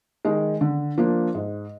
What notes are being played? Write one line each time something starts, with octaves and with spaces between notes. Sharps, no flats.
D#3 G#3
D3
F3 A#3 D4
G#2